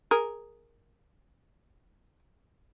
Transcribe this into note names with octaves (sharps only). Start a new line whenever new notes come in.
G#4 A#4